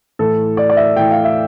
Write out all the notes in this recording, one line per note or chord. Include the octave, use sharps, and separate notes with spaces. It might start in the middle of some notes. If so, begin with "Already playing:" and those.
A2 E3 A4
D5
D5
E5
A2 E3 G5
F5
E5